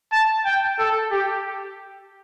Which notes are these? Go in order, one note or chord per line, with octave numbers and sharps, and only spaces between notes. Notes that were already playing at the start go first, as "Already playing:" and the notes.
A5
G5
A4
G4